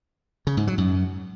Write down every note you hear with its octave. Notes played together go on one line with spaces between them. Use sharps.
C#3
G#2
F#3
F#2